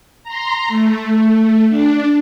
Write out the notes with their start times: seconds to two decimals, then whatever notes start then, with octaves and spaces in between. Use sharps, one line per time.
0.23 A#5 C6
0.68 A3
1.69 D4